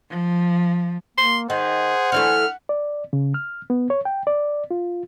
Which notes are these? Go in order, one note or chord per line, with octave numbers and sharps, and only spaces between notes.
F3
A#3 C6
D#3 G#4 C5 F#5
D3 E3 A3 F6
D5
C#3
F6
B3
C#5
G5
D5
F4